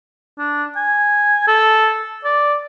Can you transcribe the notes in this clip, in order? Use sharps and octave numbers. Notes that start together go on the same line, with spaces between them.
D4
G#5
A4
D5